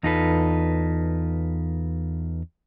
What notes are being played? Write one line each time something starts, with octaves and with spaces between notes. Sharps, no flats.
E2 D#4 F4 A4 B4